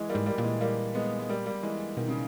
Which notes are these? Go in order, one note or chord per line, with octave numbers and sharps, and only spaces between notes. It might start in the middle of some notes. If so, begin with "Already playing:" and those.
Already playing: E3 G#3
G3 A#3
G#2
G3 A#3
A#2
E3 G#3
G3 A#3
G#3 B3
G#3
G3 A#3
G3 A#3
E3 G#3
B2 D#3
C#3